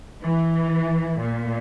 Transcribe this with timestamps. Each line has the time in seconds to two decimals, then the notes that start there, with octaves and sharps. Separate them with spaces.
0.23 E3
1.19 A#2